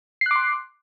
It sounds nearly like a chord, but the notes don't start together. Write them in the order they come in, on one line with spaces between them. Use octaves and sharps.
C7 F#6 D6 C6